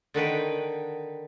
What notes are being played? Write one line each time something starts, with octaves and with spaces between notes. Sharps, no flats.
D3 D#3 B4 G5